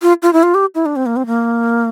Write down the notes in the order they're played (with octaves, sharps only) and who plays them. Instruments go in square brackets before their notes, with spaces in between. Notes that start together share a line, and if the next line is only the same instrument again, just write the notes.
[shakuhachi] F4
F4
E4
F4
G4
E4
D4
C4
A#3
C4
A#3